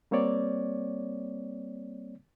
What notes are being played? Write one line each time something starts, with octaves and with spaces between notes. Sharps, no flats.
G3 A#3 C4 C#5 D5